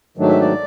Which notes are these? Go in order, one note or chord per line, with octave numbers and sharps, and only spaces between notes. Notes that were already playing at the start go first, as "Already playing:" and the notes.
G#2 D#3 F#3 A3 D4
E5
D5